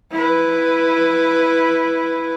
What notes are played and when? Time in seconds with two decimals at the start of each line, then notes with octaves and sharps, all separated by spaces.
0.12 E4 B4